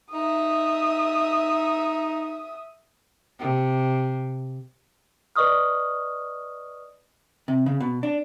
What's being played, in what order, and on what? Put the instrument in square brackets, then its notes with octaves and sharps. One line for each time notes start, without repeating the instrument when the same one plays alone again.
[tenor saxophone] D#4 [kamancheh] E5 D#6
[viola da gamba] C3
[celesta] B4 D5 D#5 C#6 D#6 F6
[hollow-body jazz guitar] C3
C#3
B2
D4